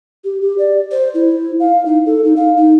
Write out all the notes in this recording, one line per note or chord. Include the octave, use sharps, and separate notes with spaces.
G4
G4
D5
C5
E4
F5
D#4
A4
D#4
F5
D#4